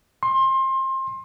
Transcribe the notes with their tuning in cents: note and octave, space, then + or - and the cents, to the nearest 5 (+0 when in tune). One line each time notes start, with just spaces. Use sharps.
C6 +25